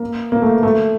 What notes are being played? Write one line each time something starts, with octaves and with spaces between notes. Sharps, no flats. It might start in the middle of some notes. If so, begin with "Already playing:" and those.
Already playing: A#3
A#3
A3
A3